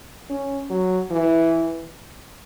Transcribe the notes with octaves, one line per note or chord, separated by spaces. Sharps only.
C#4
F#3
E3